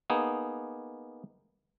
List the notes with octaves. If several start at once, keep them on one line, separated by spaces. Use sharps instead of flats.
A#3 B3 D#4 G#4